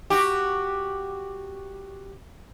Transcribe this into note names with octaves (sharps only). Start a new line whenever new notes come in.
F#4 G4